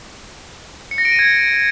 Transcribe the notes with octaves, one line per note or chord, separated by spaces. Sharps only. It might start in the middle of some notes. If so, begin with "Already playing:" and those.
C#7
A#6
D7
D#7
G#6